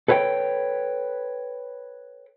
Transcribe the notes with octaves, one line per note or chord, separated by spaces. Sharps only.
A4 B4 C#5 F5 G5